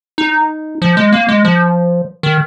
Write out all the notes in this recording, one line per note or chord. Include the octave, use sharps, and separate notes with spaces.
D#4
F3
G#3
A#3
G#3
F3
D#3